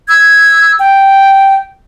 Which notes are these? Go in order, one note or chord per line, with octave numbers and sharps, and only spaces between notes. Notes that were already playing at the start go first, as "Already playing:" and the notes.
E6 G#6
G5